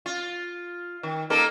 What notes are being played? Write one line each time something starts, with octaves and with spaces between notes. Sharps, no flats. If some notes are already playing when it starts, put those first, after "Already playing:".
F4
D#3
A#3 D#4 A4